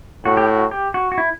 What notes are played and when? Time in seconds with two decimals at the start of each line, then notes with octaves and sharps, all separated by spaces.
0.25 A2 F#4
0.37 G4
0.48 F#4
0.71 G4
0.94 F#4
1.12 F#4
1.18 E4